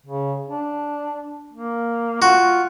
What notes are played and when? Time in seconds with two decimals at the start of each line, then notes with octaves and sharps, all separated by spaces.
0.06 C#3
0.50 D4
1.53 A#3
2.22 F4 F#4